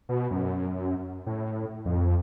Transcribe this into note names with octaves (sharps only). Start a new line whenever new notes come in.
B2
F#2
A2
F2